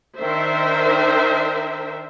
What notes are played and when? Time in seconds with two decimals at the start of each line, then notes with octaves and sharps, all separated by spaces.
0.19 D#3 D4 A#4 C5 E5